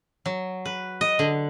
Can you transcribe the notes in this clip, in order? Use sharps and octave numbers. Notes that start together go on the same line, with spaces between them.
F#3
B4
D#5
D3